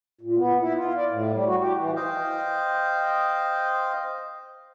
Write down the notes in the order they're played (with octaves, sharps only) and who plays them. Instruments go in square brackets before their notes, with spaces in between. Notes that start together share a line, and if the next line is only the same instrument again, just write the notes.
[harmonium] A#2
B3
E4
F4
D5
A2
G3
F#4
G4
E3
[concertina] C5 D#5 F5 G5